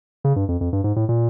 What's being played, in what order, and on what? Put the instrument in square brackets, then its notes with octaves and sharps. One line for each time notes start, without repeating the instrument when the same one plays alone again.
[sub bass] C#3
G2
F2
F2
G2
G#2
A2
A#2